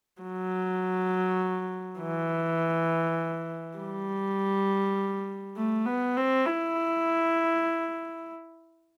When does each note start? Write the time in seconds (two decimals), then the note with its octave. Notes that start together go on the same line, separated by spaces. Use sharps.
0.22 F#3
2.00 E3
3.78 G3
5.56 A3
5.86 B3
6.17 C4
6.46 E4